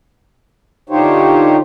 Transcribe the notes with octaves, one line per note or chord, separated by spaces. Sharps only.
D3 D#4 F4 G4 C5 C#5